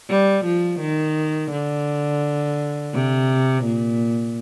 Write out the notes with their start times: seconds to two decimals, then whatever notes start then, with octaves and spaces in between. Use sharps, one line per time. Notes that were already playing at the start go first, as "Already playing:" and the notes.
0.09 G3
0.45 F3
0.81 D#3
1.51 D3
2.94 C3
3.65 A#2